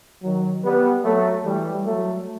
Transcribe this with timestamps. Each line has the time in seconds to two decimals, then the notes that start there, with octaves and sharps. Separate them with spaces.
0.23 D#3 F#3
0.64 G3 B3
1.04 F#3 A3
1.45 E3 G3
1.86 F#3 A3